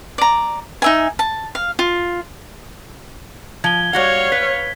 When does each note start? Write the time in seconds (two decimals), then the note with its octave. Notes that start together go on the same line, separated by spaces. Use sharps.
0.18 D5 A#5
0.82 D#4 E5 G#5
1.19 A5
1.55 F5
1.79 F4
3.64 F3 G#6 G7
3.93 G3 F#4 C#5 F5 F#5
4.32 B4 B6